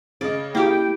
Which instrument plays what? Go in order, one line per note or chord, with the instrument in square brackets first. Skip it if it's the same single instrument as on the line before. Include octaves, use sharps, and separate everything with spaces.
[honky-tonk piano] C#3 D#5 [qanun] D5
[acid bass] A#3 [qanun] E4 G4 [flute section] G5